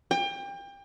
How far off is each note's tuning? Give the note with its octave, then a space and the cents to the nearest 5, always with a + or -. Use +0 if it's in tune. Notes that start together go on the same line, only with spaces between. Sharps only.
G5 +30